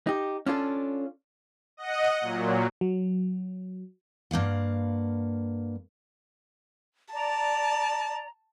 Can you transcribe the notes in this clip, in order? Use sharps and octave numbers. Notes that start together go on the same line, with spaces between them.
D#4 G4
C#4 D4 F4 A4
D#5 F#5
A#2 F#3
F#3
G2 A#3 F5 F#5
D5 A5 A#5